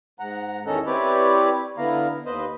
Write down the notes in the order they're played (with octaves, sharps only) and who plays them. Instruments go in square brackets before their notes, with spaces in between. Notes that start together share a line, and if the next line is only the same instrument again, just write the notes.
[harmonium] G#2 F#5 A#5
E2 D#3 C#4 D#4 A4 A#5
C4 E4 G4 B4 C#5 D5
D3 B3 E4 F5 A#5
D#2 B4 C5 D#5